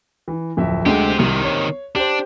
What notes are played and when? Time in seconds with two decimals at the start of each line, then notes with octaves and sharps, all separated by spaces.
0.28 E3
0.57 D1 F2 E5
0.86 D2 D3 G#3 C4 G4
1.19 C2 C3 D#3
1.44 C#5
1.95 D4 G4 C5